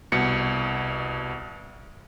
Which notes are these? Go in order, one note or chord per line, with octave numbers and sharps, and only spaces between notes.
C2 B2 C#7